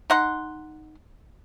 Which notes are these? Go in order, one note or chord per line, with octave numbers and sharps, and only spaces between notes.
D#4 F#5 C6